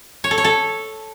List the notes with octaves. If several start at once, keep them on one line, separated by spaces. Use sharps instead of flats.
C#5
A4
C#5
A4